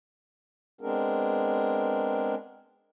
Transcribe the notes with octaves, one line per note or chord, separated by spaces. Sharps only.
G#3 B3 C4 D4 G#4 A#4